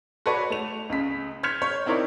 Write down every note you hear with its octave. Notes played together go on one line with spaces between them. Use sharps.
F#4 A4 B4 C#5 D5
A3 F7
C#2 C#3 B6
F6 G6 G#6 B6 C#7 F7
C#5
C4 D#4 E4 A#4 C#5 D5